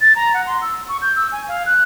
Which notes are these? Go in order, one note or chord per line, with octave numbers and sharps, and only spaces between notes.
A6
A#5
F#5
C6
E6
C#6
G6
E6
G#5
F5
F#6